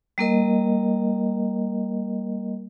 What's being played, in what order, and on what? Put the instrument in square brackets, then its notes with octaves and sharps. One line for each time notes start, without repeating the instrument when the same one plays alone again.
[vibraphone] G3 A#3 A#4 D#5